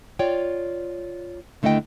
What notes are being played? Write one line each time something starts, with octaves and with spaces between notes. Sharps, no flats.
F4 C#5 D5 G5
D#2 D3 A3 E4 D#5 G5